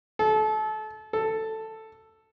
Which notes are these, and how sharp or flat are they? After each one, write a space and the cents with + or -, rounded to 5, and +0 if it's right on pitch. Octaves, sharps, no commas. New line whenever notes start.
A4 -30
A4 +5